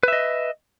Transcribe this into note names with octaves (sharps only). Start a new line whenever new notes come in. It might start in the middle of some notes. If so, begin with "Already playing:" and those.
B4 D#5 E5